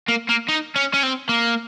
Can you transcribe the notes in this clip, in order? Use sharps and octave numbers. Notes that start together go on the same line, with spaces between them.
A#3
A#3
D#4
C#4
C#4
C4
A#3